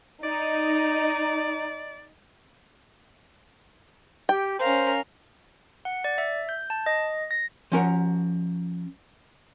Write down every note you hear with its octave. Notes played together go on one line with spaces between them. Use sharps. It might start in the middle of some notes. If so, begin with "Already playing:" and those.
D#4 D5
G4 G5
C#4 A#4 C5 F5
F#5
D5
E5
G6
A5
D#5
A#6
F3 C#4 A#4 F#5